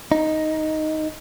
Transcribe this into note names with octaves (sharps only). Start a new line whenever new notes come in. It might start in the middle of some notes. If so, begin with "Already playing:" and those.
D#4